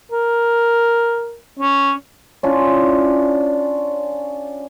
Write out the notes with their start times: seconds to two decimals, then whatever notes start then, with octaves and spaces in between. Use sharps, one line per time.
0.12 A#4
1.59 C#4
2.43 C#4 D4 E4 F4